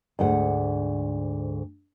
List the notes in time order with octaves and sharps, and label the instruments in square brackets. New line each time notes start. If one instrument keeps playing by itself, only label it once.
[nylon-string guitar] D2 G#2 F#5